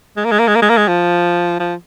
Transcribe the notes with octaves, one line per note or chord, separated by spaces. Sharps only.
G#3
A#3
G#3
A#3
G#3
A#3
G#3
A#3
G#3
F3
F3